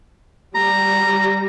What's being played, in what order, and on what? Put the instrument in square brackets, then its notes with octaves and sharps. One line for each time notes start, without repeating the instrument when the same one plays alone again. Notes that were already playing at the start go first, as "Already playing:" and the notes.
[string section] G3 [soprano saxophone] A#5